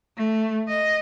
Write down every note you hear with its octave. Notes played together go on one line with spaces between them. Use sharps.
A3
D#5